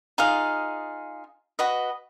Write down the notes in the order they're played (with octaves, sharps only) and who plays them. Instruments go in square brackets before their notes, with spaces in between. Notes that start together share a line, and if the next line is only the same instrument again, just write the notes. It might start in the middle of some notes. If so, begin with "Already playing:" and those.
[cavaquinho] D#4 F4 G#4 F5
F#4 B4 D#5